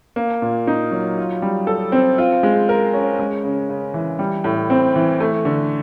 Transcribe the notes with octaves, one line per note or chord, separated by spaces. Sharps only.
A#3
A#2
D#4
F#3
F4
G3
A4
C4
F4
G#3
A#4
C#4
G#3
C#3
C#3
E3
G3
A2
C4
E3
A3
D3